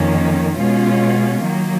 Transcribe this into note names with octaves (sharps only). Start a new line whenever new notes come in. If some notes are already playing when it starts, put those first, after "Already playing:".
Already playing: F2 D#3 A#3 C#4
B2 G#3 C#4 F4
D#3 F#3 A#3